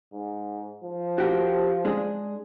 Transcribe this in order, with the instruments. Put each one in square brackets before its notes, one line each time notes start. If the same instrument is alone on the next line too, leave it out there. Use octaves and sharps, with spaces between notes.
[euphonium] G#2
F3
[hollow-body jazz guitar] F#4 G4 A#4
G#3 D4 G#4